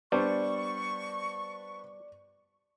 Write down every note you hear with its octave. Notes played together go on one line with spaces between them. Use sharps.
G3 B3 D4 C5 D5 C#6